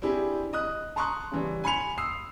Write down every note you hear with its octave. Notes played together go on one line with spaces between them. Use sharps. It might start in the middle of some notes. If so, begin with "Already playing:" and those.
C4 D4 E4 G4 G#4
D#5 D#6 F#6
A5 A#5 C6 C#6 D#6 F#6
C#3 E3 G3
G#5 B5 C6 C#7 F7
D#6 E6 C7